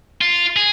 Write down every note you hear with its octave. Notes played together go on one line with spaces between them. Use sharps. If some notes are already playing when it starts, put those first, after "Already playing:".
F4
G#4